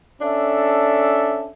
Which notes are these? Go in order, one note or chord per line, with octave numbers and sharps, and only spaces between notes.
C#4 D4 A4 E5